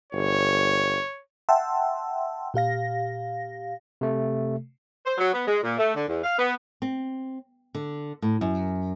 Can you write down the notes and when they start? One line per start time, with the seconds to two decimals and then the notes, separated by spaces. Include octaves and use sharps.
0.12 G1 C#5
1.49 E5 F#5 G5 A5 C6 E6
2.54 A#2 G4 F5 A#6
4.01 C3 A3
5.06 C5
5.18 F#3
5.33 B3
5.48 G#3
5.64 A#2
5.79 A3
5.95 D3
6.08 E2
6.24 F5
6.39 B3
6.82 C4
7.75 D3
8.22 A2
8.41 F#2